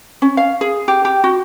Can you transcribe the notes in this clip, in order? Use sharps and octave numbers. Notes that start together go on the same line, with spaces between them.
C#4
F5
G#4
G4
G4
F#4